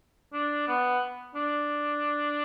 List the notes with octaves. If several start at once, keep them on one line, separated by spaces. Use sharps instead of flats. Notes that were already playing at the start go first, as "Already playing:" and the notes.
D4
B3
D4